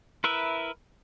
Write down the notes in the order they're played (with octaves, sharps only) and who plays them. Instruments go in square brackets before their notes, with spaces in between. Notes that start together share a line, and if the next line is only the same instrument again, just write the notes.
[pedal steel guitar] E4 A#4 B4 E5